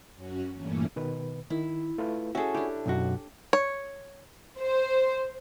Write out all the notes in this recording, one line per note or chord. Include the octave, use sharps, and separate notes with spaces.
F#2 C#4 F#4
G2 A#2 E3 A3 A#3 C#4
B2 D#3 B4
D#3 E4
A3 F4 B4
C#4 F#4 G#4 A4 E5
D4 E4 G4
B1 F#2 F#4
C#5
C5